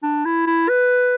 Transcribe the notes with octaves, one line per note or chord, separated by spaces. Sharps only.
D4
E4
E4
B4